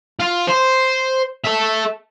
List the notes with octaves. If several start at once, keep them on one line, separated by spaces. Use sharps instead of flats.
F4
C5
A4 E5